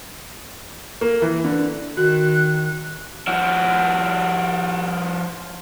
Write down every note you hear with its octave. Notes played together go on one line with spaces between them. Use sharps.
A#3
E3
D3
D#3 F#4 F#6
F3 F#4